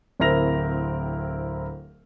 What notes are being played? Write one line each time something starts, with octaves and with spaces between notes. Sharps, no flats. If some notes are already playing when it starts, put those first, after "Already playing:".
D1 C4 E4 A#4 A#6 F7